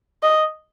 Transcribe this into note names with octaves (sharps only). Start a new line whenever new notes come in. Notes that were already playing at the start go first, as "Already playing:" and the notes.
D#5